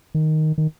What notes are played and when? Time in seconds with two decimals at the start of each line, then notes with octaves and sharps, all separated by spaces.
0.15 D#3
0.58 D#3